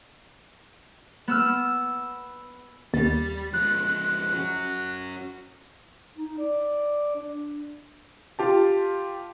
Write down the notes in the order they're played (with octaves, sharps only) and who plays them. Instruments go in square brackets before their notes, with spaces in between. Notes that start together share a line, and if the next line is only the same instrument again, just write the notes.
[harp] B3 E6 F6
[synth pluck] D#2 [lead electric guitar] G3 [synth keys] A6
[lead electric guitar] F3 G#3 [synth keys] F#6
[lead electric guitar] C#4 F#4
[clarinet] D#4
D5
D4
[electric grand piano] F4 G4 A5